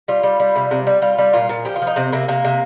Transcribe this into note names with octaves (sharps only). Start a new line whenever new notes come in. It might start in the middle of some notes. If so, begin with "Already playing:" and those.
G3 F4
G3
G3
C3
C3
G3
G3 F4
G3
A#2 F4
A#2
F3 G4
F4
F3
D#4
C3 C4
C3 A#3
C3 A#3
C3